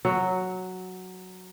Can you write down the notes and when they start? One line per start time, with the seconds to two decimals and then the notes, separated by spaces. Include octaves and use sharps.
0.05 F#3